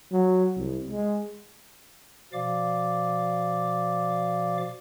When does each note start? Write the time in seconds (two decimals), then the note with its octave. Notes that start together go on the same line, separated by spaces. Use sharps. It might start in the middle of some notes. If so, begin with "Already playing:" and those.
0.12 F#3
0.56 C2
0.91 G#3
2.33 B2 F3 D5 F5 D6